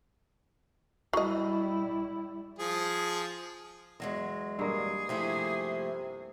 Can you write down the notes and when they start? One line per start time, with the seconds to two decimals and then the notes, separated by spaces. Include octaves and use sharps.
1.13 F#3 G3 E4 D#5
2.59 F3 G#4
4.00 E2 F#3 G#3 D#5
4.59 G2 A#3 G#4
5.09 C3 F3 A3 E4